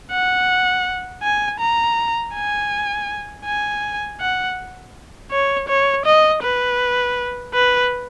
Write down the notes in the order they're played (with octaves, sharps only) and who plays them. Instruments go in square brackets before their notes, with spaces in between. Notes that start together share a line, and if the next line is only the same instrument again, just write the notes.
[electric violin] F#5
G#5
A#5
G#5
G#5
F#5
C#5
C#5
D#5
B4
B4